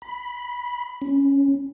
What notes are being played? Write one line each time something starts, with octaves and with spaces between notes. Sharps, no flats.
B5
C#4